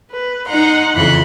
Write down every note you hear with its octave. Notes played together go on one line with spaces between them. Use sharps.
B4
D#4 F#5 A#5 C6
F2 C#3 E3 B5 C6 F#6